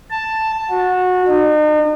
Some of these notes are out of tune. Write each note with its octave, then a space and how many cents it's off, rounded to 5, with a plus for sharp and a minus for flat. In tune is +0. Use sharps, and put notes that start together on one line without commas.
A5 +5
F#4 -20
D#4 -40